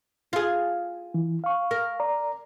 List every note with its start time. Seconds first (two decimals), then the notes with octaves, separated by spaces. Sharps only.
0.33 F4 G#4
1.14 E3
1.44 F5 C#6
1.71 A#4
2.00 D5 A#5